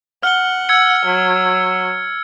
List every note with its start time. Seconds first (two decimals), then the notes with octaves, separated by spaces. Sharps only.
0.23 F#5 F6 G7
0.69 E6 G#6 C#7
1.05 F#3